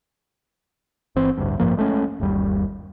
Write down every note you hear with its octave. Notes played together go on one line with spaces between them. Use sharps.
G1 E3 C4
A1 D2 G2
A1 G2 F3 A#3
G#3 A3 C4 C#4
G1 D#2 G3